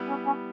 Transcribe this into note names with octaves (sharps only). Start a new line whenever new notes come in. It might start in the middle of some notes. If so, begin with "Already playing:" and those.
Already playing: G3 B3 E4 B4
C#4
C#4